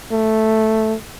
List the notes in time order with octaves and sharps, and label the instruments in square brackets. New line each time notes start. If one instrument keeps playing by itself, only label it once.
[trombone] A3